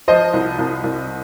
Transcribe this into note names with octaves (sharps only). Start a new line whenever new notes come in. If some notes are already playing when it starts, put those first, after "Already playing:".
F3 C5 D#5
C2
C2
C2